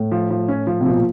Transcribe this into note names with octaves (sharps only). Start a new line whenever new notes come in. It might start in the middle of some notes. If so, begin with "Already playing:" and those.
Already playing: A2
F3
F3
C#4
F3
C3
B2 F3
A#2